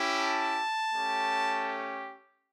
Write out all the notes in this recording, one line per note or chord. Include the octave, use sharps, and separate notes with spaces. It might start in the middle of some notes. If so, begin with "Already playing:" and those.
Already playing: C#4 E4 G4
A5
A3 C#4 G4